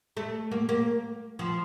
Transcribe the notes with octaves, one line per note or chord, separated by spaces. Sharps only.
A3
A#3
A#3
F3